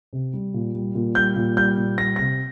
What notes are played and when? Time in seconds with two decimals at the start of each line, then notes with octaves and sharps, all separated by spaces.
0.13 C3
0.34 G3
0.54 A#2
0.75 G3
0.95 A#2
1.15 G3 G6
1.36 A#2
1.57 G3 G6
1.77 A#2
1.98 G3 A#6
2.16 C3 A#6